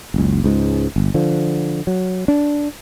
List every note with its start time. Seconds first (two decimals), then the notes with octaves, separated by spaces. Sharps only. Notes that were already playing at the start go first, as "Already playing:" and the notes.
0.14 F#1 C#2
0.44 C#2 G#2
0.96 G1
1.14 D3 F3
1.87 F#3
2.28 D4